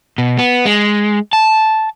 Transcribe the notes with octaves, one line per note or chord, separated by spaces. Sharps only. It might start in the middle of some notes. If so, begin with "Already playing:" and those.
B2
B3
G#3
A5